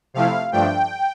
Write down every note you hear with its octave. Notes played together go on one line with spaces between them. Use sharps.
C3 F3 A3 E4 F5
G2 F3 A3 D4 G5